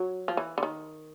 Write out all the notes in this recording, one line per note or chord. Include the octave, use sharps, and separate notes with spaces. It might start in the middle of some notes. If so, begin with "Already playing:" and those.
Already playing: F#3
F3
E3
D3
D#3